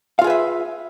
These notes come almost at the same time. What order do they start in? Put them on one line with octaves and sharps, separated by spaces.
F5 F4 G#4 B4 E5